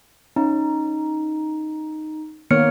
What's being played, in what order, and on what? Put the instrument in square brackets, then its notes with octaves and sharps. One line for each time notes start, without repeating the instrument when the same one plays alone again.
[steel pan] C#4 [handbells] D#4
[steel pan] D#3 A#3 B3 [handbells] C#5 F6 C#7